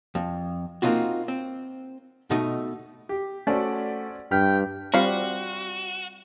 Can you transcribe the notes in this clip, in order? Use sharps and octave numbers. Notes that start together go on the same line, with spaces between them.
F2
A#3 C4 C#4 D#4 F4 F#4
C4
B2 A3 D#4
G4
A3 C#4 F#4 C5 D5
G2 G5 F6 B6
G3 C4 F4 F#4 F5 B5